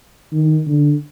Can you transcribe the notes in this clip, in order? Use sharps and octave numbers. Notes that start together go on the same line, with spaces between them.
D#3
D3